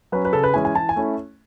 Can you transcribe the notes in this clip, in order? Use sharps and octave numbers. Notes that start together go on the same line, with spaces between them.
F#3 C#4 B4
B4
C#3 A4
B4
E3 G#3 C#4 E4 G#5
G#5
E3 A5
G#5
A3 C#4 E4